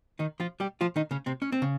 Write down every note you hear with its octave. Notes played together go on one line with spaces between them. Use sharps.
D#3 D#4
F3 F4
G3 G4
F3 F4
D#3 D#4
C#3 C#4
C3 C4
C#4
C4
C#3